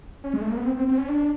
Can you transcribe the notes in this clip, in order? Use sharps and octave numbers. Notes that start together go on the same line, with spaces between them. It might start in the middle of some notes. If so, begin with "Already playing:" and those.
C#4
G#3
A3
A#3
B3
C4
C4
C4
C#4
D4